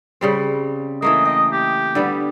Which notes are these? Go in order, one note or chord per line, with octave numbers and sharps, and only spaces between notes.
C#3 G3 C4
E3 A3 A#3 D#5
D#5 G5
G4
D3 G3 B3